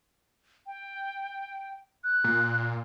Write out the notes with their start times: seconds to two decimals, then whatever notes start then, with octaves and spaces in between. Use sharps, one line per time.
0.66 G5
2.04 F#6
2.24 A#2